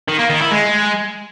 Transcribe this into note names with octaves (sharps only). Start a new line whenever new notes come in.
D#3
A#3
D#3
E4
G#3